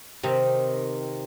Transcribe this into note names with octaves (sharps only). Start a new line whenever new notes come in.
C3 D#3